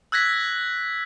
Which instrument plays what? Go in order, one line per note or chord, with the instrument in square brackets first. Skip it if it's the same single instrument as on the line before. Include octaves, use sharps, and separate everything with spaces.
[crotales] E6 F#6 G#6 A#6 B6